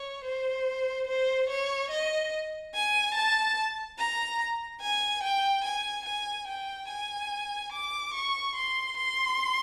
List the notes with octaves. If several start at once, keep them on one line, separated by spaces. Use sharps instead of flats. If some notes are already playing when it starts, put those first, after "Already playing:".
Already playing: C#5
C5
C5
C#5
D#5
G#5
A5
A#5
G#5
G5
G#5
G#5
G5
G#5
D6
C#6
C6
C6